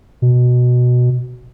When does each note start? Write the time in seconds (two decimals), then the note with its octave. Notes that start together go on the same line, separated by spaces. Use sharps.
0.22 B2